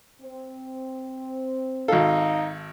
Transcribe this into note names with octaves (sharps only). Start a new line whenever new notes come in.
C4
G#1 D#4 A4 F5